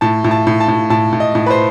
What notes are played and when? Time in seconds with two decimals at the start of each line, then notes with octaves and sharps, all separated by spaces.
0.01 A2 A5
0.24 A2
0.31 A5
0.47 A2
0.60 A5
0.68 A2
0.90 A2 A5
1.12 A2
1.20 D#5
1.35 A2
1.46 B4
1.50 C5